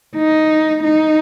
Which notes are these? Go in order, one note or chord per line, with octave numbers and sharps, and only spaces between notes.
D#4
D#4